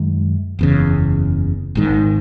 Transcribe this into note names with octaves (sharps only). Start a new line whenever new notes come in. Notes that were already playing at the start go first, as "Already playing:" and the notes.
Already playing: F#2 D#3 G#3
F#1 E2 C#3
G#1 G#2 D#3